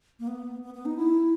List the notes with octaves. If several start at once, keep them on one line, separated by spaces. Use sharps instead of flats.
A#3
B3
B3
B3
D#4
E4